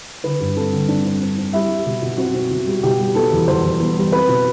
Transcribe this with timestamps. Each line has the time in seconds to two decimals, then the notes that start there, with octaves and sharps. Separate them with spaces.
0.24 D3 B4
0.40 G2
0.56 C4 A4
0.72 D3
0.88 C4 D4
1.05 C4
1.21 C4
1.37 C4
1.53 G3 E4
1.69 G3
1.86 B2
2.02 B2
2.18 C4 F#4
2.34 C4
2.50 B2
2.67 G3
2.83 B2 G4
2.99 G3
3.15 B3 A4
3.32 E2
3.48 E2 C5
3.64 E2
3.80 B3
3.97 G3
4.12 C4 B4
4.28 B2